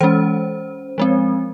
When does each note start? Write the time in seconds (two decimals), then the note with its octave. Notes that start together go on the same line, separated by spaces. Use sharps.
0.01 E3 G#3 C#4 C5
0.98 F3 G#3 C4